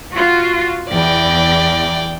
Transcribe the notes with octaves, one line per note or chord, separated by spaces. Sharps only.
F4 F#4
E2 D5 G5